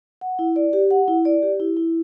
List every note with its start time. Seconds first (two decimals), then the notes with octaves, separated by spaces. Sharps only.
0.21 F#5
0.39 E4
0.56 D5
0.73 G4
0.91 F#5
1.08 E4
1.25 D5
1.42 G4
1.60 E4
1.77 E4